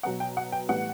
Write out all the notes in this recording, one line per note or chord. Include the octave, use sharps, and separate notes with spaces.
B2 F#3 B3 F#5
G5
F#5
G5
A2 E3 G3 B3 F#5